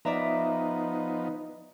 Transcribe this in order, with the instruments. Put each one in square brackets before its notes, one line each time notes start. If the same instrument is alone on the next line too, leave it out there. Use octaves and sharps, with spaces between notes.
[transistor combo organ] F3 B3 D#4 [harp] D5 E5 A#5